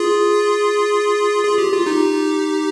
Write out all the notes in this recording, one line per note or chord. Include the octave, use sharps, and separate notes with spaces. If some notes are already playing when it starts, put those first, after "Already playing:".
Already playing: F4 G#4
G#4
G4
F4
D#4 G4